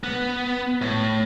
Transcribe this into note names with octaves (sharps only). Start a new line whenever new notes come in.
B3
A2